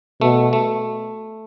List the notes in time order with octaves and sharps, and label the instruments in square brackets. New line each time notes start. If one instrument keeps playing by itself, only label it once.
[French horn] B2 [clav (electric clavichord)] A3
[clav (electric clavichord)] A3